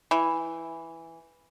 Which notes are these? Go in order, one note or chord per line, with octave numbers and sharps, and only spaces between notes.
E3